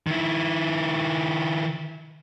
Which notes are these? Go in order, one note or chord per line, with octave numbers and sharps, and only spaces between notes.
D#3 E4